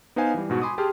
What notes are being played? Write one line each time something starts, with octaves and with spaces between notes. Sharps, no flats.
B3 D#4 B4 C5 F5 G#5
E3 G3
G#2 B2 F#4
G#5 B5 C6 D6 D#6
G4 G#4 A5 C6 F6